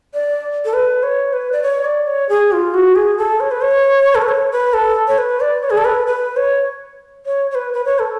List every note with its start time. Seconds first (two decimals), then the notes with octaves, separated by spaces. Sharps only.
0.14 D5
0.65 A4
0.73 B4
1.03 C#5
1.33 B4
1.52 D5
1.63 C#5
1.85 D5
2.07 C#5
2.29 G#4
2.52 F4
2.74 F#4
2.95 G#4
3.18 A4
3.40 C#5
3.51 B4
3.61 C#5
4.15 A4
4.22 B4
4.29 C#5
4.52 B4
4.74 A4
5.08 C#5
5.18 B4
5.40 D5
5.63 C#5
5.70 G#4
5.77 A4
5.85 B4
6.07 B4
6.37 C#5
7.26 C#5
7.51 C#5
7.55 B4
7.74 B4
7.85 C#5
7.99 A4